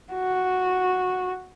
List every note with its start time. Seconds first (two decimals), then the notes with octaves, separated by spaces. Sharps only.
0.13 F#4